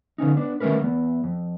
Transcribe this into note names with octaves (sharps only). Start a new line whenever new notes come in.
D3 B3 C#4 D#4
B3 D4
D#3 G3 A3 C#4 A#4 B4
E2 B3
F2